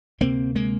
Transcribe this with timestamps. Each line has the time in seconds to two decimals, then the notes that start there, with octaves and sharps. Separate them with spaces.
0.20 D2 C3 A#3 C4
0.55 G#3 A#3